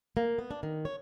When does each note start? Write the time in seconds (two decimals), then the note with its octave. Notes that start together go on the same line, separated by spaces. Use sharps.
0.17 A#3
0.39 B3
0.51 D4
0.63 D#3
0.85 C#5